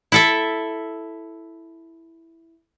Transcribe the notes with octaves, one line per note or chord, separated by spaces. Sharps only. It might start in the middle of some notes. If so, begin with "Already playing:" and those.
E4 A4 E5